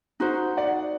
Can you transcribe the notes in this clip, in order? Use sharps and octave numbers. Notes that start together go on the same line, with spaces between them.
D#4 F#4 C5
D5 F#5